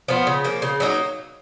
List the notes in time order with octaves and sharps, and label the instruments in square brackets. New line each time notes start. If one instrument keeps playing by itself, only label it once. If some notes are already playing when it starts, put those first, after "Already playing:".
[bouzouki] F3 B3 F4
C#3
F3 A#3
C#3
F#3 A#3 D#4